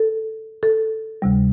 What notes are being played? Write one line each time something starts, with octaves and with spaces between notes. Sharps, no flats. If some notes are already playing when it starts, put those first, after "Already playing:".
Already playing: A4
A4
D2 C3 G3